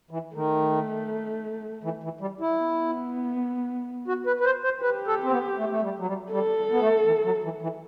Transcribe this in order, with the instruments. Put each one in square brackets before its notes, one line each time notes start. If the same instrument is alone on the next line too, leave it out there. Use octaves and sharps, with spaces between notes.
[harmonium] E3
[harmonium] D#3 [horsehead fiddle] A3
[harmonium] E3
E3
G3
E4
[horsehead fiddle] B3
[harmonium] F#4
B4
B4
C5
C5
[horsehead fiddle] G4 [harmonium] B4
[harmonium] A4
C4
B3
A3
A3
G3
F#3
G3
[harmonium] G3 [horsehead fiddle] A4
[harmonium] B3
A3
E3
F#3
E3
E3